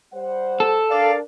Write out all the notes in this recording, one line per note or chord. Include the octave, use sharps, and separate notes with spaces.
G3 C5 F#5
A4
D4 A#4 D5 F5